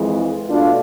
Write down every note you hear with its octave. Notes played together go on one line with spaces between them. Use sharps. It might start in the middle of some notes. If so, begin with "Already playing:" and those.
Already playing: F2 E3 G#3
B2 A3 D4 F4